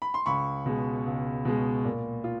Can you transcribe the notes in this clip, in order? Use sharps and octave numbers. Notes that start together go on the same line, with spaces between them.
B5
C6
C#2 B5 C#6
B2 G#3
C#2
B2 G#3
A#2
F4